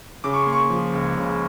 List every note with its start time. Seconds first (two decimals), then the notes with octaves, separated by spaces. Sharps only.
0.24 C#3 D6
0.34 C#6
0.43 A#3 C6
0.53 C#6
0.70 F3
0.93 C#2
1.16 C#3